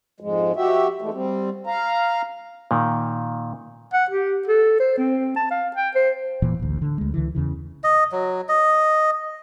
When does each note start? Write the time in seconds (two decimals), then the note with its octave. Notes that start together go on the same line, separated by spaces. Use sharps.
0.20 F2 G#2 G#3
0.56 F#4 G4 E5
1.01 E3 G#3 A3
1.13 G3 C4
1.67 F5 A#5
2.71 A#2 D#3
3.93 F#5
4.11 G4
4.47 A4
4.80 C5
4.98 C4
5.36 A5
5.51 F5
5.76 G5
5.95 C5
6.42 E1 A#2 E3
6.59 A1 D2
6.82 D3
6.98 D2 G#3
7.14 C#2 D3 E3
7.35 E2 C#3 E3
7.84 D#5
8.12 F#3
8.48 D#5